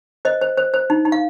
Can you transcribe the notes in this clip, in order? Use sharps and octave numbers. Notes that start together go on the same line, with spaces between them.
C5 D#5
C5
C5
C5
D#4
D#4
F5